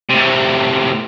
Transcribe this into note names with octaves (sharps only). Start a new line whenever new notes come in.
A2 C3